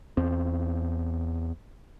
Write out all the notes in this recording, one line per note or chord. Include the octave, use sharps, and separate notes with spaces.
E2 C4